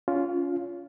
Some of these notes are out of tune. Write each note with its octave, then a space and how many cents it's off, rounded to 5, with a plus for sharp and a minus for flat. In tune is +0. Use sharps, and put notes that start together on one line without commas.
C#4 +30 F4 +0